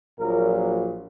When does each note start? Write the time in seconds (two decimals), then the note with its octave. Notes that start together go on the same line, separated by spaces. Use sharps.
0.19 A#1 A#2 F#3 A#3 A#4